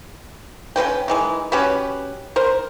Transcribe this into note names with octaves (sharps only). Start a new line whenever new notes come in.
C#3 D#4 B4 G5
D#3 E3 G#3
C#4 F#4 G4 B4
A#4 C5